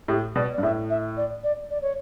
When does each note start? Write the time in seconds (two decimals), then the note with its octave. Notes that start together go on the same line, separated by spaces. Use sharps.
0.08 A2 G4
0.35 B2 D5
0.53 D5
0.58 G2
0.63 A2 E5
0.90 E5
1.17 D5
1.44 D5
1.70 D5
1.82 C#5